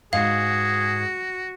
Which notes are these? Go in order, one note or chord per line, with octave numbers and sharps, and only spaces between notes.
G#2 F#4 G#4 F5